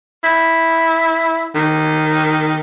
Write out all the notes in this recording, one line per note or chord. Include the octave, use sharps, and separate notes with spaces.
E4
D#3